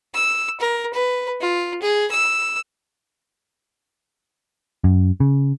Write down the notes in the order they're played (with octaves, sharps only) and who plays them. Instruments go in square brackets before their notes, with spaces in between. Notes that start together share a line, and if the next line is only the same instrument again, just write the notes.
[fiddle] E6
A#4
B4
F4
G#4
E6
[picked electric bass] F#2
C#3